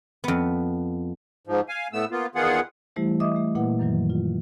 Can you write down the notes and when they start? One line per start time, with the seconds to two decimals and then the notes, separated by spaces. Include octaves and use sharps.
0.24 F2 B3
1.47 G#2 F3
1.69 F5 G#5
1.93 A2 A3 B3 E6
2.11 A#3 B3 F4
2.35 E2 D#3 B3 F4 G#4 F#5
2.96 E3 G3 A3 E4 G4 C5
3.20 D#5 E5 D6 D#6
3.36 A3
3.55 A#2 A#3 E4 B4 F#5
3.79 F#2 D#3 E3 F#3
4.10 F4